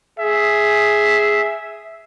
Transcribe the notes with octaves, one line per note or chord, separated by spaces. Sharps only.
G#4 E5